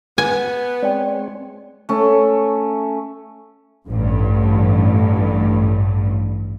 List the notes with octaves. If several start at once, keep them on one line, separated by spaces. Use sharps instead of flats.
B3 G#5
G#3 C4 C#5 D5 G5
A3 C#4
A1 G2